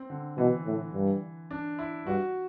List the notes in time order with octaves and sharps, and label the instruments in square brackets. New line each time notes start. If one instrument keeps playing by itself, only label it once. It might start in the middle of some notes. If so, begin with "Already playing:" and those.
Already playing: [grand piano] C4
D3
[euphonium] B2 [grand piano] E3
[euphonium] A2
G2
[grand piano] D4
E4
[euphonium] G2 [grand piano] F#4